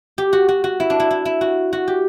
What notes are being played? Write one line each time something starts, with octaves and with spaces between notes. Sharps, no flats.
G4
F#4
F#4
F#4
E4
D4
E4
E4
E4
F#4
F#4
G4